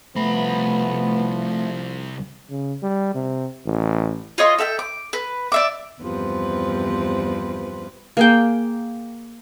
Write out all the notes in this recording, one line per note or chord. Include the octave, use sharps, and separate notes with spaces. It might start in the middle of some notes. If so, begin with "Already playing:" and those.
C2 F3 A3 B3 B5
C#3
G3
C3
A1
F4 C#5 D#5 C6
A4 E5 F5 G5
D6
B4
D5 E5 D6
E2 G2 C3 F3 B4
A#3 G#4 G5